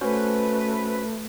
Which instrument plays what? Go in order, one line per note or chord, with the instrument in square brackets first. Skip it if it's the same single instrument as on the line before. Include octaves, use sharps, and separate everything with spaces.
[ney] A3 [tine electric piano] C#4 F#4 C5 [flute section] B4